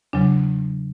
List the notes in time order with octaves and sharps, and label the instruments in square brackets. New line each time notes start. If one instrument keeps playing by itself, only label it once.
[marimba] E2 C#3 F#3 D4